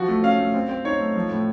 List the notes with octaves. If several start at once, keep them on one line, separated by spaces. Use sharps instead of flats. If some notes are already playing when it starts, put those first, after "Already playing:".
Already playing: F3 F#4
A3
C#4 F5
A3
C4
C4
D#4 C#5
A3
F3
A2